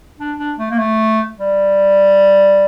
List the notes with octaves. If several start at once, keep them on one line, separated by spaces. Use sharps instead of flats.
D4
D4
A3
A#3
A3
G3